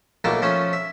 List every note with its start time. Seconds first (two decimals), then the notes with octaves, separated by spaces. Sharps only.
0.24 B1 A3 A#3 F4 A5 A#5
0.42 F3 A3 C#4 C5 C#5
0.73 E5